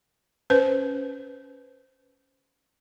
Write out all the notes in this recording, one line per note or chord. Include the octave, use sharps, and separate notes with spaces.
C#4 B4 C5